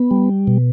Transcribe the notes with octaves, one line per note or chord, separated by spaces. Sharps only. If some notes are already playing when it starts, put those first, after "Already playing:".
Already playing: B3
G3
B2